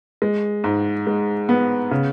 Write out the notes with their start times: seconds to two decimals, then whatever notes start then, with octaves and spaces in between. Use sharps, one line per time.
0.22 G#3
0.64 G#2
1.07 G#3
1.49 B3
1.91 C#3